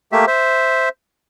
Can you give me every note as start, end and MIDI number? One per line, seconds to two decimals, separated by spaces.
0.12 0.25 57
0.12 0.25 58
0.12 0.25 67
0.12 0.25 76
0.27 0.89 72
0.27 0.89 76